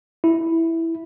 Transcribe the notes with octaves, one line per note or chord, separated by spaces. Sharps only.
E4